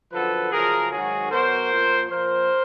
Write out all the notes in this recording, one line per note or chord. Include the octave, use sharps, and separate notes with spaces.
F#2 D3 F3 A4 B4
F#2 C#3 F3 G#4 A#4
G#2 D#3 F#3 F#4 G#4
B2 F#3 A#4 C5
A#2 F3
A#2 F3 A#4 C5